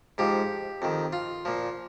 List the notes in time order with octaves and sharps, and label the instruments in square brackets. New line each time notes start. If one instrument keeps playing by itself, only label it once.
[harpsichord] G#2 F3 G4
F2 D#3
F4
A#2 F3